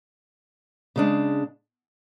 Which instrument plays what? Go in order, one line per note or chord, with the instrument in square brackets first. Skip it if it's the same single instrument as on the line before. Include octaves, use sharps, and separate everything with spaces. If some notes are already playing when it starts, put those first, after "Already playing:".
[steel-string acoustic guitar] C#3 G#3 D4